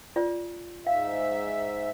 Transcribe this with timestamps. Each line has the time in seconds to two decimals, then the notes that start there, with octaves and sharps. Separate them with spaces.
0.16 F4 D5
0.87 G#2 E5 F5